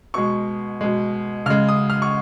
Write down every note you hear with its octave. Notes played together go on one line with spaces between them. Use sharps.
B2 G#3 C#6
B2 G#3
C#3 G#3 F6
D#6
F6
C#6